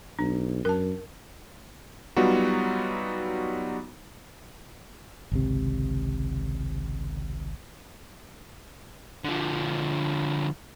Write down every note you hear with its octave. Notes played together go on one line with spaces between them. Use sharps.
B1 D4
F#2 A#4 A5
F#3 G3 B3 D#4 F4 F#4
G#1 C#2 C3
D3 F3